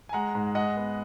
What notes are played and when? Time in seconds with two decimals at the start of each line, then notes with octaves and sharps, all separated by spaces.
0.09 G#5
0.13 G#3 F#5 A#5
0.35 G#2
0.55 G#3 D#5 F#5
0.76 B3